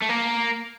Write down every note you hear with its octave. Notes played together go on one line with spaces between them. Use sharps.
A3
A#3